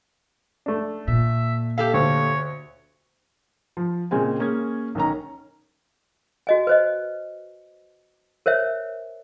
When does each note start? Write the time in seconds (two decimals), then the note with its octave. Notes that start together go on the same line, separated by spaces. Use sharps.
0.66 A3 D4
1.08 A#2 E5
1.78 G4 A4 E5 F5
1.94 D2 C#5
3.77 F3
4.11 A#2 C#3 G#3 C4 G#5
4.40 A#3 C#4 G#4 G#6
4.95 B1 D#3 C#4 A#5
6.47 F#4 D#5 G#5
6.67 B4 C5 D#5
8.46 A#4 C5 C#5 E5